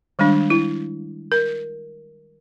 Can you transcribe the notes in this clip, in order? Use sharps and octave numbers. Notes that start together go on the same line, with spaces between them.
D#3 G3 G#3 D4
E4
A#4